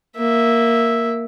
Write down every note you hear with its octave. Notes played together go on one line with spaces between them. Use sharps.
A#3 E5